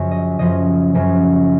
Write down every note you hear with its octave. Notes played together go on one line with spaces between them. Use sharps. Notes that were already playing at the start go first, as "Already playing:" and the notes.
Already playing: F#2 C#3 F3
D#5
F#2 C#3 F3 D#5
F#2 C#3 F3